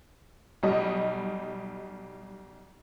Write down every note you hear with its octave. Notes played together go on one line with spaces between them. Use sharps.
B1 G3 D#5